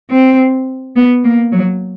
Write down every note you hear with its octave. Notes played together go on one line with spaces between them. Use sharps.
C4
B3
A#3
F#3